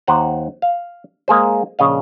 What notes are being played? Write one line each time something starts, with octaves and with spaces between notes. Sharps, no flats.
D#2 C5 F#5 A#5
F5
G#3 A#3 G#4 C5
A#1 C#3 D#5 F5